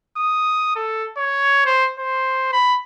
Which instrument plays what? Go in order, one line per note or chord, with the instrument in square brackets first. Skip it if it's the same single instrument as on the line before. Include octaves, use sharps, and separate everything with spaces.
[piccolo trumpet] D#6
A4
C#5
C5
C5
B5